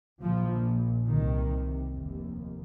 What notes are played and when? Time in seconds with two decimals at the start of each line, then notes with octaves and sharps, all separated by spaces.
0.21 A#1 A#2 F3
1.07 C2 C3 D#3
1.93 F1 D#2